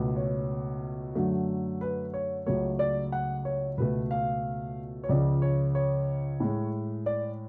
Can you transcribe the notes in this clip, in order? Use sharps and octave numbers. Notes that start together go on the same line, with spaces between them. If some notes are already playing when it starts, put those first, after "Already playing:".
Already playing: C#2 B2 A3
C#5
F#2 D3 F#3 A3
B4
C#5
C#2 C#3 F#3 A3 C#5
D5
F#5
C#5
C#2 B2 A3 B4
F5
C#5
C#2 C#3 F3 D5
C#5
C#5
A2 G#3
D5